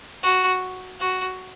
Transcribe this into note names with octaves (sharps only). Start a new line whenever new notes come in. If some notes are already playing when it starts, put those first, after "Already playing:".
F#4
F#4